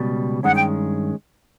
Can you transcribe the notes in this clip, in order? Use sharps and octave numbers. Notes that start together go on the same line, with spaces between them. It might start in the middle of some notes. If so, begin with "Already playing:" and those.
Already playing: C#2 B2 G3
G2 D#3 G#3 C#4 F#5
G5